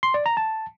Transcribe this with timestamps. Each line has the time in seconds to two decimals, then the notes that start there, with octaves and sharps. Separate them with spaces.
0.03 C6
0.14 D5
0.26 A#5
0.37 A5